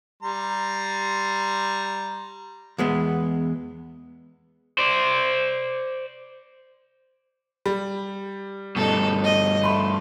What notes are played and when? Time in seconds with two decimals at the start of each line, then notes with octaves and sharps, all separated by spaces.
0.23 G3 A#5 C6
2.78 E2 G#3 B3
4.78 C5 D5
7.66 G3
8.76 G2 B2 D#4 A4
9.24 D#5
9.63 A3 B5 C6